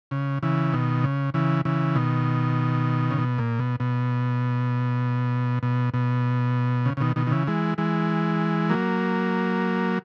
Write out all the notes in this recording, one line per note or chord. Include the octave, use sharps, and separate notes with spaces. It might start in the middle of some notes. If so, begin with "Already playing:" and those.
C#3
C#3 E3
B2 D#3
C#3
C#3 E3
C#3 E3
B2 D#3
C#3
B2
A#2
B2
B2
B2
B2
C#3
C#3
B2 D#3
B2 D#3
D#3
C#3 E3
E3 G#3
E3 G#3
F#3 A#3